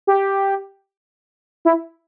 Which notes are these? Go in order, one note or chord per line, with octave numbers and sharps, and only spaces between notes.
G4
E4